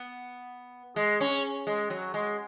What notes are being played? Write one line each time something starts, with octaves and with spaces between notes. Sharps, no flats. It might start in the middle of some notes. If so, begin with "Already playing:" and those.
Already playing: B3
G#3
C#4
G#3
F#3
G#3